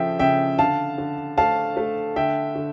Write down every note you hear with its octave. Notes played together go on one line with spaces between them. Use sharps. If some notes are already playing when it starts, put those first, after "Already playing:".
Already playing: C#3 F3 A3 E5 G5
C#3 E5 G5
D3 F5 A5
D3
A3 F5 A5
A3
D3 E5 G5
D3